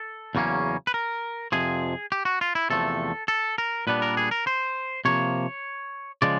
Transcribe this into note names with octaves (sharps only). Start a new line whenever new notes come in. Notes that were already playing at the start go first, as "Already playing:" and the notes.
Already playing: A4
E2 C#3 F#3 A#3 C#4
B4
A#4
F2 C3 F3 G#4
G4
F#4
F4
E4
E2 C3 F3 A3 A4
A4
A#4
A#2 G3 B3 D4 B4
A#4
G#4
A#4
C5
C3 F3 A#3 C#5
C#3 F3 G#3 D5